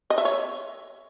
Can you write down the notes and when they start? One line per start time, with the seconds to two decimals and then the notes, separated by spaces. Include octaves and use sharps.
0.10 D#5
0.18 E5
0.25 C#5